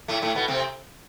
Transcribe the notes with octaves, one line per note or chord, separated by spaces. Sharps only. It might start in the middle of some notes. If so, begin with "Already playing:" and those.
A2 A3
A2 A3
B2 B3
C3 C4